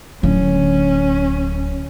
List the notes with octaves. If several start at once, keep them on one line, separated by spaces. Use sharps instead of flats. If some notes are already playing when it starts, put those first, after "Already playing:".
D1 D3 C#4